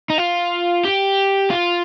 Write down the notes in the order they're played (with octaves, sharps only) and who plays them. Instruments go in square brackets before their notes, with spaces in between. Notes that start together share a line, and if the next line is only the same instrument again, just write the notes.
[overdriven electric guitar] D#4
F4
G4
F4